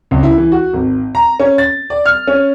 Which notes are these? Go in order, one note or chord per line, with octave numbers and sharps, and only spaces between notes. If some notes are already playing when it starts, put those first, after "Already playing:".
C#2
E4
E3
F#4
G#1
A#5
C#4
A6
D5
F6
C#4